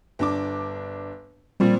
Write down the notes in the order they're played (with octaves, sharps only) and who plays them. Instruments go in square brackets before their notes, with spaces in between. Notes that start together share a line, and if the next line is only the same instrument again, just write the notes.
[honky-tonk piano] G1 D4 D6
[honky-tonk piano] A#2 F3 C4 [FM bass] G3